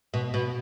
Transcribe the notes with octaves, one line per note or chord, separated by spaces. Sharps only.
B2
B2